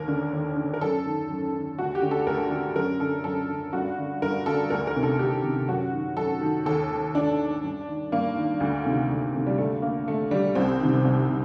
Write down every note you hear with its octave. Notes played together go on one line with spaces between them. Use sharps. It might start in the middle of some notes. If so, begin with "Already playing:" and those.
Already playing: D#2 A#4
D3
D#2
D3
A#4
F#2 A4
D#3
F#2
D#3
D2 F#4
G4
D3
A4
D2 A#4
D3
F#2 A#4
D3 A4
F#2 A4
D3
G2 F#4
D3
G2 A#4
D3 A4
D2 A#4
A#4
C3 D#3
A4
D2 G4
C3 D#3
F#2 F#4
D#3
F#2 A4
D#3
D#2 A4
D#3
D#2 D4
D#3
G2
D#3
G2 A#3
D#3
D2
C3 D#3
D2
C3 D#3
G3
D2 A3
D3 A#3
D2 A3
D3 G3
C2 C4
C3 D#3
C2
C3